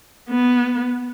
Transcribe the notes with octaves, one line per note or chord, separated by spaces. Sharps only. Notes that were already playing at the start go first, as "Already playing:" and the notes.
B3